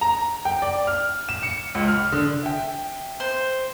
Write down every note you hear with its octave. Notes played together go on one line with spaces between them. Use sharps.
A#5
G5
D5
F6
E7
C#7
C#2
F6
D3
E5 G5
C5